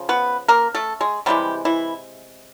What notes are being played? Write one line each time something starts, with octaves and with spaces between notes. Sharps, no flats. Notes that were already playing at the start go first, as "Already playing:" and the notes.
Already playing: C#3 F3
B3 B4
A#3 A#4
A3 A4
G#3 G#4
C3 E3 G3 G#3 G4
E3 E4